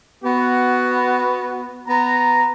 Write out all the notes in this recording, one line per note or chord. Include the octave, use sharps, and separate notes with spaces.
B3 F#4
B3 A#5